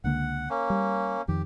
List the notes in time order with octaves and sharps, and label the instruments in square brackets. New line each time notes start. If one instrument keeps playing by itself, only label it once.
[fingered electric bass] C#2 D3 A#3 [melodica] F#5
[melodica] A#3 C#4
[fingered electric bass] G3
[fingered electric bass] F2 D#3 [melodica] G4